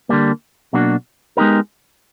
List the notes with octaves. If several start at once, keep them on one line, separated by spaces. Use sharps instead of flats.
D3 G3 A#3
B2 F#3 A#3 D4 F#4
G#3 B3 D#4 G4 A#4